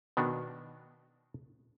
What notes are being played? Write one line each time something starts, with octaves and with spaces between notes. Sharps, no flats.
B2 D#3 B3 D4 F#4